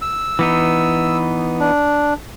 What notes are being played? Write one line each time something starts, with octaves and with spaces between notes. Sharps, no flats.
E6
E3 B3 D#4
D4